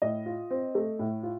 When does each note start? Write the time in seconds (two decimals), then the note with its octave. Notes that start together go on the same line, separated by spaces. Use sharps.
0.02 A2 D#5
0.26 F4
0.51 C4
0.75 A3
0.99 A2
1.23 F4